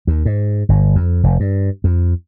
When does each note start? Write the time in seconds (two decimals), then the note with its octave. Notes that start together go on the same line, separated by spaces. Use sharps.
0.07 D#2
0.25 G#2
0.69 G1
0.95 F2
1.23 F1
1.40 G2
1.84 F2